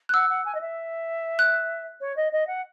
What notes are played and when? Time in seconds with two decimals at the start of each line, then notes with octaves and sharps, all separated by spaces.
0.09 F#6
0.14 F#5 E6
0.30 F#5
0.45 G#5
0.55 D#5
0.61 E5
1.39 F#6
2.01 C#5
2.17 D#5
2.32 D#5
2.47 F#5